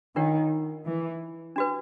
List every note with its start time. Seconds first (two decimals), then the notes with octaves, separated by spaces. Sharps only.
0.16 D#3 D4 F4 A#4 C#5 F#5
0.86 E3
1.56 D4 F#4 B4